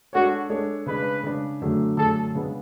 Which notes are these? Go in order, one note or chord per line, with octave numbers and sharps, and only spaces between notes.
G#3 D4 F#4 A4 C#5
G#3 D4 A4 C#5
C#3 G#3 D4 B4
C#3 G#3 D4
F#2 D3 A3 D4 G#4
F#2 D3 A3 D4 G#4 A4
C#3 G#3 B3 D4